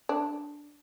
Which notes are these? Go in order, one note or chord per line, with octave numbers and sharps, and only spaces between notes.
D4